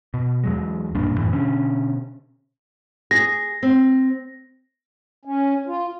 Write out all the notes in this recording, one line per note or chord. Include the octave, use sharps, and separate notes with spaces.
B2
E2 F#3 G#3
B1 G2 A#2 D4
F#2 A2 E3
B2 D3 C#4
G#4 A#6
C4
C#4
F4